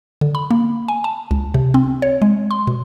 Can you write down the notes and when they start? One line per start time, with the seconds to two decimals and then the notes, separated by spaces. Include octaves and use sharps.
0.21 D3
0.35 B5
0.51 A#3
0.88 G#5
1.04 A5
1.31 C#2
1.54 C3
1.74 C4
2.02 C#5
2.22 G#3
2.51 C6
2.67 B2